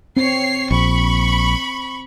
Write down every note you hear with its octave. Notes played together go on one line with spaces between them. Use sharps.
C4 C#5 C7
A#1 B5 C#6